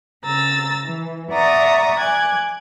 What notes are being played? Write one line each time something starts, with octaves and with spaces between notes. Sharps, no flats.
C#3 A#5 E6 A6
E3
D5 E5 F#5 A#5 C#6 D#6
G#5 D6 F#6 G#6